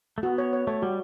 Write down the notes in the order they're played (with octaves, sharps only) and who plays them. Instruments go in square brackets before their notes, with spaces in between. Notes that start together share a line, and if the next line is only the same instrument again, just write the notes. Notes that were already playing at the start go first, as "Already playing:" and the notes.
[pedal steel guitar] A3
[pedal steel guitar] B3 [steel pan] F#4
[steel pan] C#5
C#5
[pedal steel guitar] A3 [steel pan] C#5
[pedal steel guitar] G3 [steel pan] F#4